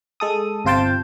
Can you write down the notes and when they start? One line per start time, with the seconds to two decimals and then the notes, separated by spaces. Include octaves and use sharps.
0.20 G#3 A4 D#6
0.65 G1 C3 F4 C5 G5 A5